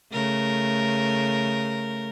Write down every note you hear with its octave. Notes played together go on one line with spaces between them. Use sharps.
C#3 A3 A#4